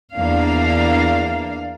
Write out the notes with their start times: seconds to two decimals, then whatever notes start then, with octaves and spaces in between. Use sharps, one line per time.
0.15 E2 A#3 D4 F5